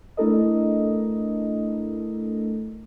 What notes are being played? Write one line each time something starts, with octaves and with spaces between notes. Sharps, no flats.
A3 D4 E4 A4 A#4 D#5